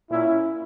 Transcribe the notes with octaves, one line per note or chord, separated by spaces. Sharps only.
A#2 C#4 E4